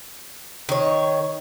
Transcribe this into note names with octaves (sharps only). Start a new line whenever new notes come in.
D#3 C#5